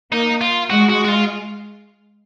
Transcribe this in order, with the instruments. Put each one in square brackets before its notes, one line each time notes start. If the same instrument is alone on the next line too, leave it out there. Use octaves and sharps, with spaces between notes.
[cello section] A#3 [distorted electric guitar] D#4
[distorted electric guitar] F4
[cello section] G#3 [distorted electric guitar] F#4
[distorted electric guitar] F#4
F#4
F4